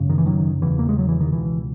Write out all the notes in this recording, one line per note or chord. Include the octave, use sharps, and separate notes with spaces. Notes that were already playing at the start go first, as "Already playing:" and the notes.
Already playing: G#1 F#2 C#3
D#3
E3
D#3 F#3
E1 E2 C#3 E3
A#3
G#3
F#3
E3
D#3
C#2 B2 E3